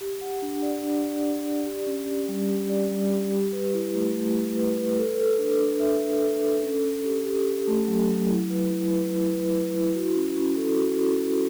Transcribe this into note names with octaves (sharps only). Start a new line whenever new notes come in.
G4
F#5
D4
D5
D4
D5
D4
D5
G4
C#4
G4
G3
G4
D5
G3
G4
G4
B4
E4
A3
A3
A3
B4
B4
A4
A4
D4
D4
E5
E5
A4
A4
C#4
C#4
G4
G4
G4
A3
F#3
F#3
E4
B4
E4
B4
E4
B4
B4
E4
F#4
C#4
C#4
A4
F#4
C#4
C#4